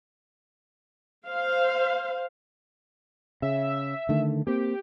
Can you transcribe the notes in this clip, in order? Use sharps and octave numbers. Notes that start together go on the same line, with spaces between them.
C5 F5
C#3 E5
D3 D#3 A3
A#3 C4 G4